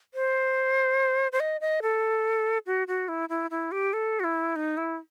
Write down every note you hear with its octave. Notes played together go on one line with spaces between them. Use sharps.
C5
C5
D#5
D#5
A4
F#4
F#4
E4
E4
E4
G4
A4
F#4
E4
D#4
E4